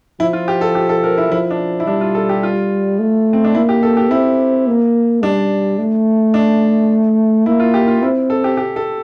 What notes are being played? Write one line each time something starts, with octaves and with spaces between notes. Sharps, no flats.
F3 E4
F4
G4
A4
G4
A4
A#4
E4
F3 E4
D4
E4
G3 D4
F4
A4
G4
F4
A3
C4
D4
A#3 E4
G4
A4
G4
C4 E4
A#3
G3 D4
A3
D4
A#3 E4
F4
G4
F4
C4 E4
A4
G4
G4
A4